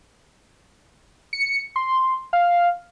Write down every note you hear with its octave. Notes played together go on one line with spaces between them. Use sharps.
C#7
C6
F5